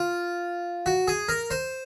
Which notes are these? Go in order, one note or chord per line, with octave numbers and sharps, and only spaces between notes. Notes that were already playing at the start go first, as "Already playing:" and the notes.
Already playing: F4
F#4
G#4
A#4
C5